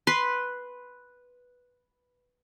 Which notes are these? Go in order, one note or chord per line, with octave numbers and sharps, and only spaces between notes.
B4 C6